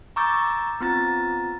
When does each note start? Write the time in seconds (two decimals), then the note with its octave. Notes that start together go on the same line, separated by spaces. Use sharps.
0.16 A#5 C#6 D6 E6 G6 A6
0.80 B3 C4 F4 A#5 A6